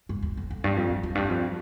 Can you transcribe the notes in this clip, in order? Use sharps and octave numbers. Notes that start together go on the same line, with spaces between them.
G2
E2
F2
F2
G2
F2
G2
F2
G2
F2